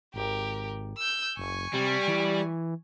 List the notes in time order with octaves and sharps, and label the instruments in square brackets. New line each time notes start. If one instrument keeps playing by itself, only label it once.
[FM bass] G#1 [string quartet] G4 A#4
[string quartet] E6 G6
[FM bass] F#1 [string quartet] G#5 C#6
[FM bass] C3 [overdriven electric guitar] G3
[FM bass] E3